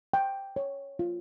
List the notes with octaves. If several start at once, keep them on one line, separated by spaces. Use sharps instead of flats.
G5
C#5
F4